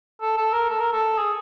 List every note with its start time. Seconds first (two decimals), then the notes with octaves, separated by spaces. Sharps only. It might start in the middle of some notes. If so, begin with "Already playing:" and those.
0.21 A4
0.37 A4
0.53 A#4
0.70 A4
0.80 A#4
0.93 A4
1.18 G#4